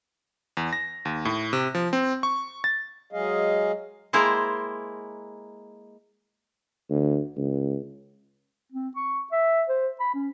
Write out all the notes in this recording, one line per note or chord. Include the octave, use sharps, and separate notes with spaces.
E2
A#6
D#2
A2
C3
F3
C4
C#6
A6
F#3 G#3 G#4 D#5 F5
G#3 A#3 E4 A#4 C5 G5
D2
C#2
C4
C#6
E5
C5
B5
C#4